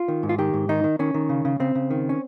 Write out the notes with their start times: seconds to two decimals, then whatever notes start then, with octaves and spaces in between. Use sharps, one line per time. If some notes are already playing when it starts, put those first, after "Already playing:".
Already playing: F4
0.08 D#3
0.23 G#2
0.29 F4
0.38 D#3 G4
0.54 G#2
0.69 D#3 D#4
0.84 D#3
0.99 D#3 C#4
1.14 D#3
1.29 C#3
1.45 C#3
1.60 C#3 C4
1.75 C#3
1.90 D#3
2.09 C#4